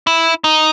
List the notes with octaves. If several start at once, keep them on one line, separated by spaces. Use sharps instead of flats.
E4
D#4